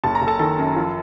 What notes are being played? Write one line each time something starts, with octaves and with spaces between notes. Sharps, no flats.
F#1 A5
A#5
F#1
A4 A5
D#3 A4 A5
F#2
F3